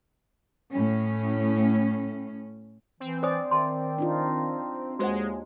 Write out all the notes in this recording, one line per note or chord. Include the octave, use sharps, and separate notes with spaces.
A2 C#4
E3 C4
C5 D5 G#5 D#6
D#3 E5 A5 C6
D4 D#4 F4
D#2 G#3 F#4 C5 F#5